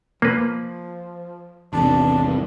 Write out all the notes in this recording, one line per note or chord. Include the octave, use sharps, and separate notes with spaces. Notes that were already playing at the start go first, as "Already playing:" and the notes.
F3 A#3 B4
G#1 E2 C3 D4
G2